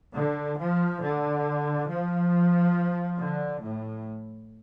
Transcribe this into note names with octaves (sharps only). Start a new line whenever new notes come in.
D3
F3
D3
F3
D3
A2